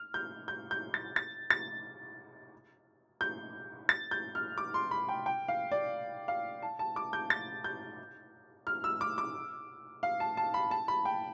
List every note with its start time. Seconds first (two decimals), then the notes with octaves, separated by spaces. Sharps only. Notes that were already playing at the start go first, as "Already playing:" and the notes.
Already playing: F6
0.14 G6
0.48 G6
0.71 G6
0.94 A6
1.16 A6
1.50 A6
3.21 G6
3.89 A6
4.11 G6
4.35 F6
4.58 D6
4.74 C6
4.91 B5
5.09 G5
5.26 G5
5.48 F5
5.72 D5
6.28 F5
6.62 A5
6.79 A5
6.96 D6
7.13 G6
7.30 A6
7.64 G6
8.67 F6
8.84 E6
9.01 D6
9.18 D6
10.03 F5
10.20 A5
10.37 A5
10.54 B5
10.71 A5
10.88 B5
11.05 G5